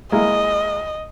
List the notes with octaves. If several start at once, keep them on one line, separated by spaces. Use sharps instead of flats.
G#3 A#3 E4 D#5